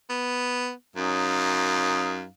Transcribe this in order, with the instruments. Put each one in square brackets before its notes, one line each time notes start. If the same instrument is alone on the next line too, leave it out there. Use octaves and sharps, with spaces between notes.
[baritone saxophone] B3
[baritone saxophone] F#2 [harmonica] C#4 D#4 F5